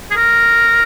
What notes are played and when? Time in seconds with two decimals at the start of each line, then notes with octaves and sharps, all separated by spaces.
0.11 G#4
0.16 A#4